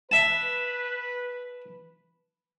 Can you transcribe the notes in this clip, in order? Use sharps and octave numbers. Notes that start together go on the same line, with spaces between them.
B4 E5 A5